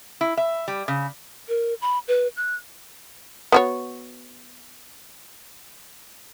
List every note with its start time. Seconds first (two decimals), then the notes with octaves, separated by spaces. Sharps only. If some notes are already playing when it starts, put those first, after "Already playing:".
0.21 E4
0.37 E5
0.68 G3
0.88 C#3
1.49 A#4
1.81 B5
2.08 B4
2.37 F#6
3.52 B3 F#4 C#5